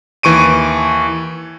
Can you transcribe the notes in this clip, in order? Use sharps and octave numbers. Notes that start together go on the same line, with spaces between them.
D#2 E3 C#6 D7 D#7